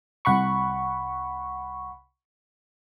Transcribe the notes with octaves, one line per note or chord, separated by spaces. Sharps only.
C2 F#5 B5 C#6